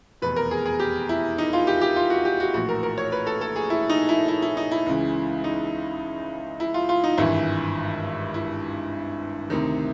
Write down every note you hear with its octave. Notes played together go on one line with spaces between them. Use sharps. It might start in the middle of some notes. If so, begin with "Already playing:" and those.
F1 E2 B2 B4
A#4
G#4
G#4
G4
E4
D#4
F4
G4
G4
F4
F#4
G4
F#4
A#1 A2 E3 F#4
A#4
A#4
C#5
B4
A4
A4
G#4
E4
D#4
E4
E4
E4
D#4
E4
C#2 C#3 E3
D#4
E4
F4
F4
D#4
G#1 G2 E3 E4
E4
D2 C3 D#3